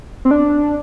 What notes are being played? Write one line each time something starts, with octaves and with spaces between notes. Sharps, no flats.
C4
D4